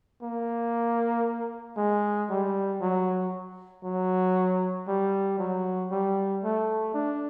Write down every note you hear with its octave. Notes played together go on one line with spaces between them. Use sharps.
A#3
G#3
G3
F#3
F#3
G3
F#3
G3
A3
D4